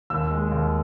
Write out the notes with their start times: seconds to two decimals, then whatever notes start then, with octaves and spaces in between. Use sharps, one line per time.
0.10 D#2 E6
0.31 G#3
0.51 D#2